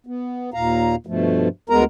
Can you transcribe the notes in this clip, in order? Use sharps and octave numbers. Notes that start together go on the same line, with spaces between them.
B3
D#2 A#2 F5 A#5
G2 B2 F3 A3
D2 G#3 B3 A#4 A#5